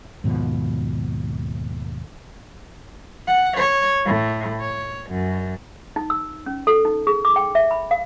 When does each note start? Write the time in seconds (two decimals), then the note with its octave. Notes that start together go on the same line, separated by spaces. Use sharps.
0.24 D#2 G#2 B2 F3
3.28 F#5
3.57 C#5
4.06 A2
4.61 C#5
5.11 F#2
5.96 D#4
6.10 E6
6.46 C#4
6.67 A4
6.85 D#4
7.07 G#4
7.25 D6
7.36 G5
7.55 E5
7.71 B5
7.91 F5